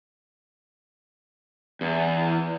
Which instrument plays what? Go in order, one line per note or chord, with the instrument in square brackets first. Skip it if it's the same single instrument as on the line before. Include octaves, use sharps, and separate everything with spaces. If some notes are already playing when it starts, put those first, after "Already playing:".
[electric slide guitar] E2